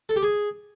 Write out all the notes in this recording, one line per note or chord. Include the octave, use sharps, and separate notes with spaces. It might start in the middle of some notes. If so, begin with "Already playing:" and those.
A4
G4
G#4